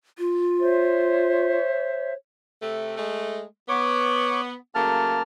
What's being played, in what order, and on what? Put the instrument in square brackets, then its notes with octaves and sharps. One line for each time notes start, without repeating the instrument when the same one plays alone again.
[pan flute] F4
[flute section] C5 C#5 E5
[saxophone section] C3 A3
G#3 A3
[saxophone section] B3 [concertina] C#5 D6
[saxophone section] C#3 F#3 A3 [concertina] A#3 A5 F6